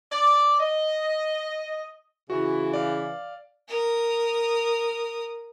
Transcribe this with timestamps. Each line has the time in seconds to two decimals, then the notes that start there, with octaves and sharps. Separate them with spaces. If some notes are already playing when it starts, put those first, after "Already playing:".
0.12 D5
0.60 D#5
2.30 C#3 E3 F#4
2.73 D5 F5
3.68 A#4 D#6